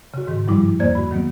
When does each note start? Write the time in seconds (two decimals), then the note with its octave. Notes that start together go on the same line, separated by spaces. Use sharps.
0.14 C#3 F#4
0.27 G#2 D#3
0.47 G2 F3 G3 E4 D6
0.80 E2 D3 A#3 C5 D5 G#6
0.95 F#4 B5
1.11 D#3 F#3 A#3 B3